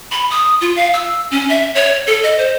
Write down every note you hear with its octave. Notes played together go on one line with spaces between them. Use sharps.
B5
D#6
F4
F5
E6
C#4
E5
C#5
A4
D#5
C5